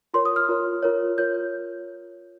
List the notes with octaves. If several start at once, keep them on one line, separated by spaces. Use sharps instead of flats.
F4 A#4 C#5 C6
D#6
F6
F4 A#4 C#5
F4 A#4 C#5
F4 A#4 C#5 G6